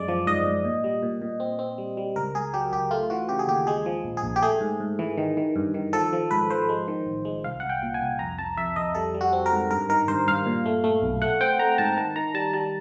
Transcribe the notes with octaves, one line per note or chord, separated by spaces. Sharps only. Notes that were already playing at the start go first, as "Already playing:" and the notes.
Already playing: F#2 G#3 D5
F3
G#2 D#5
G#2
A#2
G3
A#2
A#2
C4
C4
G3
G3
C#2 A#4
C#2 G#4
F#3 G4
C#2 G4
A3 F4
E3 F#4
C#3 G4
G#4
D#2 G4
G#3 G#4
F3
A#1
G#4
A#1
G4
A3 G#4
G#2
G#2
E3
D#3
D#3
G2
D#3
F3 A4
F3
G#2 B4
F3 C5
G#3
D#3
A1
G#3
C2 F5
C2 F#5
G5
A#2
G#5
C2
F2 A#5
F2 A5
F2 E5
F2 D#5
G3 A4
G3
F#4
C4
A#4
G#2
G2 A#4
D#3 A#4
G2 C5
G2 F5
A#2
A3
A3
B1
A3 F#5
C4 G5
A3 A#5
G#2 A5
D#3 A5
D#3 A#5
G3 A5
G3 A5